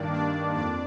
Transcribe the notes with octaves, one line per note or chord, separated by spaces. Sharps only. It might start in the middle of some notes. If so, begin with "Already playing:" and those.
Already playing: G2 D#3 A#3 D4 D5
D4 D5
F2 D4 D5